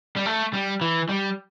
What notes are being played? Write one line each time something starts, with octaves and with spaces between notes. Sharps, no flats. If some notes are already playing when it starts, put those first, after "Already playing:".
G3
A3
G3
E3
G3